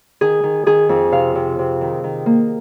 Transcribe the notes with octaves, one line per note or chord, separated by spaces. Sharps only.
D#3 G#4
D#3
D#3 G#4
F2
C3 F5
C3
C3
D#3
D#3
A#3